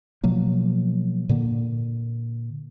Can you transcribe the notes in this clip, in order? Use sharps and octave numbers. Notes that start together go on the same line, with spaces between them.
B2 F3 F#3 A#3
A#2 D3 A#3